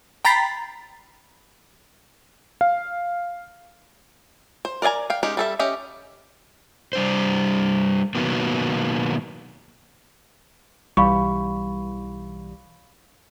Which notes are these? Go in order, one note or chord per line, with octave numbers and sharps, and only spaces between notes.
G5 A#5 B5 A6 B6 C7
F5
C5
A#4 D5 D#5 G#5 A#5
F5 G5
G#3 C#4 D#4 G4
G3 A4 E5
C#4 G4 D#5 E5
G3 D4 C5
B2 D#3 F#3 A#3 B3
B1 E3 G3 F5 B5 C#6